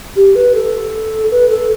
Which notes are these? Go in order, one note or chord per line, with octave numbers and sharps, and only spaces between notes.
G4
B4
A4
B4
A4